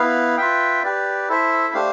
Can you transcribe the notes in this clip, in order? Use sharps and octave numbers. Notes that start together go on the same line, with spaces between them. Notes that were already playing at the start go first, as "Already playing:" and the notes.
Already playing: B3 E4 B4 F5
F4 B4 E5 G5
G4 B4 D5
E4 A4 C5 E5
A3 D4 G4 C5 F5